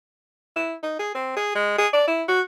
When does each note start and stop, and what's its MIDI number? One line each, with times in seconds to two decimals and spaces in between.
0.56 0.73 64
0.83 0.95 63
0.99 1.14 68
1.15 1.35 60
1.36 1.53 68
1.55 1.78 56
1.78 1.87 68
1.93 2.05 74
2.07 2.23 64
2.28 2.41 66